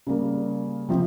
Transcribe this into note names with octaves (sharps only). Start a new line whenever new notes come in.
C#3 G3 A#3
C3 F3 C4